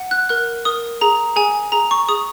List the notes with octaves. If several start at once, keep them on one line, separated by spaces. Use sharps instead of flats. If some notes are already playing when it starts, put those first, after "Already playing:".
Already playing: F#5
F#6
A#4 F#6
A#4 D#6
G#4 A#5
G#4 G#5
G#4 A#5
C#6
G#4 D#6